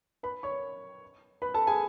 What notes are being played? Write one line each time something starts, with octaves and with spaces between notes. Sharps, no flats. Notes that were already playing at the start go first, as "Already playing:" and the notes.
B4 B5
C#5 C#6
B4 B5
A4 A5
G#4 G#5